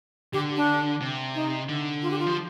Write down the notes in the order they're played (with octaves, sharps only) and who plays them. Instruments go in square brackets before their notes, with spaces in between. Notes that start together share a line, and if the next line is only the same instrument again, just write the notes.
[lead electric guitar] D3 [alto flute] G4
[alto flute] D4
[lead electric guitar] C3
[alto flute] D#4
[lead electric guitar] D3
[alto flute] F4
G4
F4
[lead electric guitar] F3